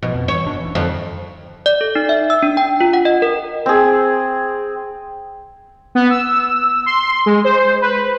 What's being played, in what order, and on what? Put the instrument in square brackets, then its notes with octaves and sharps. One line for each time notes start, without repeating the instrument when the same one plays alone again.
[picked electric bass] A1 F3 [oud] B2
[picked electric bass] F2
[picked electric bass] E3 [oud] C#5
[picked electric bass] G1 B2 D4
D#1 E3
[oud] F2 [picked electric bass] D3 D#3 G3
[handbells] D5
A4
D#4
E5
E6
D4
G5
F4
F#5
D#5
A#4
[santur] C4 G#4
[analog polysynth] B3
E6
C6
G#3
C5
B4